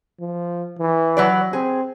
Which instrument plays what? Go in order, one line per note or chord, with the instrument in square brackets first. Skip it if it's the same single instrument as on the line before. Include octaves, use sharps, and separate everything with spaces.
[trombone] F3
E3
[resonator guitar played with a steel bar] F#3 B4 D5
[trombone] C4 [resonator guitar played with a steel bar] G#4